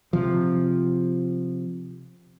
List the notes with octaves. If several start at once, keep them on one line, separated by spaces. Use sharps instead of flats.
C3 F3